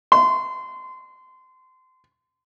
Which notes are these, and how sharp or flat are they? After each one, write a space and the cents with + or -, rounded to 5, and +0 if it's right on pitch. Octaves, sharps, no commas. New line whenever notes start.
C6 -25